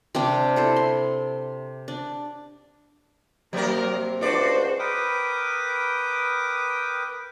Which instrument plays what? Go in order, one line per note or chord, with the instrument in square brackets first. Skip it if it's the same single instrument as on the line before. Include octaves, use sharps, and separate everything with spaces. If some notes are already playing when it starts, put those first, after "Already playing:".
[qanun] C3 G3 D4 G5
E4 A4 C5
C6
D4
[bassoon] C3 [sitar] F#3 A#4 [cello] A#3
[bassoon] C#2 [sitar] D4 D5 [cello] F#4 C5
[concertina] A#4 B4 G5 D6 D#6